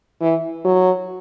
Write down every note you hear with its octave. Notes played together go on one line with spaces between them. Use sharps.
E3
F#3